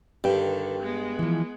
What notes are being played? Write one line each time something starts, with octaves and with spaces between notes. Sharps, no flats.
G2 D3 D#3 G4 B4 G5
G#3 B3
E3 F3